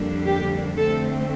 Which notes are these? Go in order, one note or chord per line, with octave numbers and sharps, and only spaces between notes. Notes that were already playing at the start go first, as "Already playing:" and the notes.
Already playing: F2 D3 G3 A#3 D4
G4
D3 A3 C4 A4